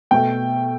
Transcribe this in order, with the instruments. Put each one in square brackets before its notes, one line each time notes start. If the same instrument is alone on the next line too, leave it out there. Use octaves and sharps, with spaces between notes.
[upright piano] B2 A3 G5